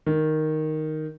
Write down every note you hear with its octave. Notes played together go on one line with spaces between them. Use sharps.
D#3